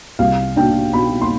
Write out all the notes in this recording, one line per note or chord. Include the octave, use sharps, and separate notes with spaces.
C2 F5
D4 G5
B2 B5
C6